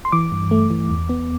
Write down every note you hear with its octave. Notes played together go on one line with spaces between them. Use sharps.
C6
E3 D6
G2
A3
E3
E2
B3